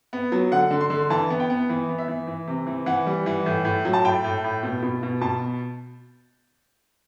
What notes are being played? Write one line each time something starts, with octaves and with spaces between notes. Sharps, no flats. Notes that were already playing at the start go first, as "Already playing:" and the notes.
B3
F#3
D3 F#5
D3
C6
D3
E3 A5
B3
G5
B3
E3
B3
E5
E3
E3
C3
E3
E3 F#5
G3
E3
A2
A2
F#3
A5
A2 G5
A2
A2
B2
B2
B2
B2 A5